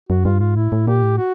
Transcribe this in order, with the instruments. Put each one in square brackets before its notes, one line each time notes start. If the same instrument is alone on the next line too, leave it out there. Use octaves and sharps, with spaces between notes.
[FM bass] F#2 [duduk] F#4
[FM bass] G2 [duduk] F4
[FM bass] G#2 [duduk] F4
[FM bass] A2 [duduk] E4
[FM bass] A2
[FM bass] A#2 [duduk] G4
[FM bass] A2
[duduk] F#4